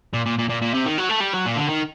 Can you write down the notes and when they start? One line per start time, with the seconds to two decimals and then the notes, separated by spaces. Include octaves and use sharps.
0.14 A#2
0.26 A#2
0.39 A#2
0.49 A#2
0.62 A#2
0.74 C3
0.86 D#3
0.98 F#3
1.09 A3
1.20 G3
1.33 F#3
1.45 A#2
1.56 D3
1.68 D#3